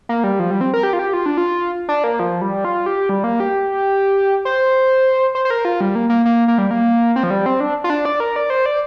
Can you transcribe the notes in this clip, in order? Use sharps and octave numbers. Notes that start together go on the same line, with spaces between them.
A#3
G3
F3
G3
C4
A#4
G4
F4
G4
F4
D4
F4
D4
A#3
F3
G3
F4
G4
G3
A#3
G4
C5
C5
C5
A#4
F4
G3
A#3
A#3
A#3
A#3
G3
A#3
C4
F3
G3
C4
D4
F4
D4
D5
A#4
D5
C5
D5